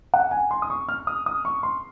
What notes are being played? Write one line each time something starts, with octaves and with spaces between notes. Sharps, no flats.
F#5
G#5
C6
D#6
C#6
F6
D#6
D#6
C#6
C6